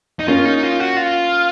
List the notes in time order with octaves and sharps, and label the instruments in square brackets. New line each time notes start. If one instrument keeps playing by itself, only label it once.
[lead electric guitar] D#4
[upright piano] A#3 C#4 [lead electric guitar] F4
[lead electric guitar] D#4
F4
F#4
F4